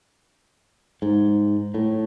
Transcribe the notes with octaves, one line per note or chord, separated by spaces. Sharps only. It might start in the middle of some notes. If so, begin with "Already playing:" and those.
G#2
A2